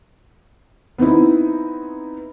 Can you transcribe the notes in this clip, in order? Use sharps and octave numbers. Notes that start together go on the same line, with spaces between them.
B3 C4 D#4 E4